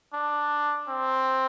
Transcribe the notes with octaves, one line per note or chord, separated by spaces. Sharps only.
D4
C4